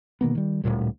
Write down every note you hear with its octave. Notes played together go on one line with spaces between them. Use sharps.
B2 D#3 A#3 B3
D#3 G3
D1 D2 A#2 G3